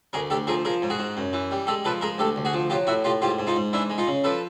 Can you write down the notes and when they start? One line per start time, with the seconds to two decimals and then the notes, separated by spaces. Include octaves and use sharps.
0.13 D2 G#4 A#4
0.30 D2 G4 A4
0.47 F3 G#4 A#4
0.65 F3 G#4 A#4
0.82 G#2
0.90 F#4 G#4
0.99 G#2
1.17 F#2
1.33 E3
1.51 G3
1.67 G#3 G4 A4
1.85 F3 A4 B4
2.01 G#3 G#4 A#4
2.18 D2 G4 A4
2.36 D2
2.45 F#4 G#4
2.54 F3
2.70 F#3 F4 G4
2.87 A2 E4 F#4
3.04 A2 F4 G4
3.22 G#2 F4 G4
3.39 G#2
3.47 D#4 F4
3.56 G#2
3.73 E3 D4 E4
3.90 G#3
3.98 D#4 F4
4.07 C#3
4.24 F3 A4 B4